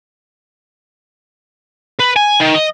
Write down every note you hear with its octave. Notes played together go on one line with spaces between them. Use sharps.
B4
G#5
D#3
D#5